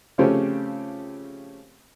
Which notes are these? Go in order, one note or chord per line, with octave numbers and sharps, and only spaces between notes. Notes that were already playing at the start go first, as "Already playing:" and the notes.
C#3 F3 A3 C4 C#4 G4